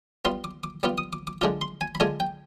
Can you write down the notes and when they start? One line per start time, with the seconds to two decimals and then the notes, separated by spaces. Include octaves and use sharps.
0.25 G3 B3 F4 C6
0.44 D6
0.64 D6
0.83 G3 B3 F4 D6
0.98 D#6
1.13 D6
1.27 D6
1.41 D3 G#3 D4 F4 D6
1.61 C6
1.81 G#5
1.95 B5
2.00 D3 G#3 D4 F4 G#5
2.20 G5